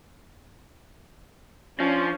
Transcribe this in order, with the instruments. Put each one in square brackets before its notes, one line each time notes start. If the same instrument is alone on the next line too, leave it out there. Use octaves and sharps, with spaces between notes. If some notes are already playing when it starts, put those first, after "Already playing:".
[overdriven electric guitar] F3 [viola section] C#4 D4